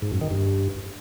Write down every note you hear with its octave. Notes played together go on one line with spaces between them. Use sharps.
G#2
F#2
D#3
G2